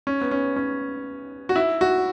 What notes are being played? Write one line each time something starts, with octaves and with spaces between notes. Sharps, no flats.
C#4
B3
C#4
C#4
F#4
E4
F#4